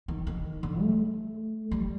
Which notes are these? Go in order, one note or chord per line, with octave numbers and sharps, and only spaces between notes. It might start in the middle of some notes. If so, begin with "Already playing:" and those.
D#3
D#3
D3
A3
G3